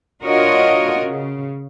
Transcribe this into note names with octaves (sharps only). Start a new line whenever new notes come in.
D4 F4 F#4 A#4 C#5 D#5
C#3